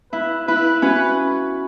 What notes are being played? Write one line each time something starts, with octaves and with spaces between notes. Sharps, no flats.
E4 B4
E4 B4
C#4 F#4 B4